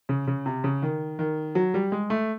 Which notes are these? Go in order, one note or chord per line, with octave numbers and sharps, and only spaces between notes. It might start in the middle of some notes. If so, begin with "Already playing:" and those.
C#3
C#3
C3
C#3
D#3
D#3
F#3
G3
G#3
A3